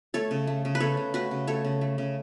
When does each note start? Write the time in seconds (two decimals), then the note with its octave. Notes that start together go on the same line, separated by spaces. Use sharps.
0.14 A3 A4 C#5
0.31 C#3
0.47 A3
0.65 C#3
0.75 B4
0.80 C#3 A4 C#5
0.97 C#3
1.14 A3 F#4 B4
1.31 C#3
1.47 A3 A4 C#5
1.65 C#3
1.81 A3
1.98 C#3